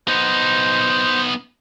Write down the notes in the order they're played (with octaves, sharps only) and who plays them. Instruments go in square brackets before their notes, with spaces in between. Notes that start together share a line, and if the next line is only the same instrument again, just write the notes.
[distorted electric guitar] B3 D#4 [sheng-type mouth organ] C5